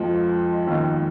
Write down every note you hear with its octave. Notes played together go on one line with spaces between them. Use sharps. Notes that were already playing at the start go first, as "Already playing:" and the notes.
Already playing: F2 F3 G#3
D#2 D#3